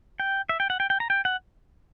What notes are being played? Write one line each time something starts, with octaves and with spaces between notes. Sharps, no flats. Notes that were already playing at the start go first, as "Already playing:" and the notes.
G5
E5
G5
F#5
G5
G5
A#5
G5
F#5